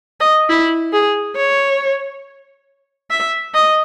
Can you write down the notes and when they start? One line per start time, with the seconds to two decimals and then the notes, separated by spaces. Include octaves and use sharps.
0.20 D#5
0.49 E4
0.92 G#4
1.36 C#5
3.10 E5
3.54 D#5